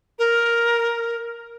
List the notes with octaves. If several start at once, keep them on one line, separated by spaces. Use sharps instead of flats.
A#4